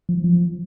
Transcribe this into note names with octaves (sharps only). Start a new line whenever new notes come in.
F3
F3